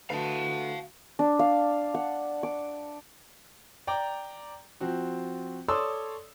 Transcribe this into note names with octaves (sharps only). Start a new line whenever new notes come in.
D3 A3 F#4 B4 F5 A5
D4
F5
F#5
D6
D5 G5 A#5 D6
F3 C4 F#4
A4 C#5 D5 C6 D#6 E6